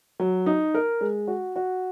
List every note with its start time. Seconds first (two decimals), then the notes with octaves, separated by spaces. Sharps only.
0.20 F#3
0.46 D#4
0.75 A#4
1.01 G#3
1.27 F#4
1.56 F#4